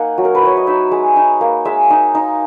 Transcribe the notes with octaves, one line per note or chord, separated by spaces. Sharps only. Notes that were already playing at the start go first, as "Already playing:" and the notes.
Already playing: A#3 D#4 F#5 G#5
F#3
A#4
B4
E4 C#5
D#5
D#4 E5
G#3
D#4
A#3
G#3 E5
D#4
D#4